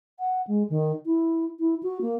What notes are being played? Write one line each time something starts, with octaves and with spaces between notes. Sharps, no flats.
F#5
G#3
D#3
E4
E4
F#4
A#3